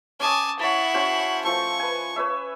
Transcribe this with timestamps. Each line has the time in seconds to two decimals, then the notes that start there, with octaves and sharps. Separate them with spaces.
0.20 C#4 G#5 A5 D6 D#6
0.59 E4 C#5 F#5 A5
0.94 C#4 F#4 C5
1.44 F3 A3 C#6
1.79 B4 G#5
2.16 B4 C#5 E5